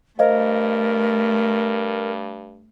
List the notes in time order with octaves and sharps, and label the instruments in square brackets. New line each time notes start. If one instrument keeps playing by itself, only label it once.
[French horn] G2 [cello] A3 [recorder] A#4 [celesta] C5 D#5 F5